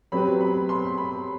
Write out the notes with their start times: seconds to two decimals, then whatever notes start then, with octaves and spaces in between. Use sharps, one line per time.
0.12 F#3 C4 G4 B4 B5
0.41 B5
0.69 C6
0.98 B5